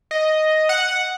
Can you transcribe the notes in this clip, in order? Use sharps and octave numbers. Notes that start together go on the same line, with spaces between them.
D#5
F#5